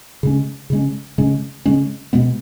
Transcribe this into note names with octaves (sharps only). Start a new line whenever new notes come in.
C#3 G#3 C#4
C#3 G#3 C#4
C#3 G#3 C#4
C#3 G#3 C#4
B2 G#3 B3